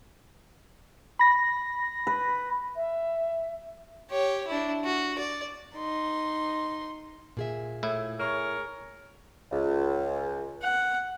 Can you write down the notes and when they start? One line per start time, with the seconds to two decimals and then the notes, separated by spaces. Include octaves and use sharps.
1.19 B5 A#6
2.07 B4
2.76 E5
4.10 G4 C#5
4.48 D4 E4
4.85 F#4
5.19 D5
5.76 D#4 C6
7.37 A#2 G#4 E5
7.83 A2 E4
8.19 G#4 A#4 C#5
9.51 C#2
10.63 F#5